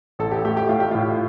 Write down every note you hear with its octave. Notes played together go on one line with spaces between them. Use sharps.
A1 A4
G4
A3 G4
G4
A2 F4
G4
A2 F4